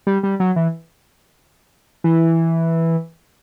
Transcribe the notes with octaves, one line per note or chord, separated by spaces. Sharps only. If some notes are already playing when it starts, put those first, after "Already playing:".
G3
G3
F#3
E3
E3